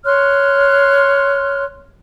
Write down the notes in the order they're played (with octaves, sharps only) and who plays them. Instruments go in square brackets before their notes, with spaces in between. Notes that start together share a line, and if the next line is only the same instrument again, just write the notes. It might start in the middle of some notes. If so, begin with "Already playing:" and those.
[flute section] C#5 C6 F6 F#6